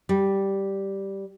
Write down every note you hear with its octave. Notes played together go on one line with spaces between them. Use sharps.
G3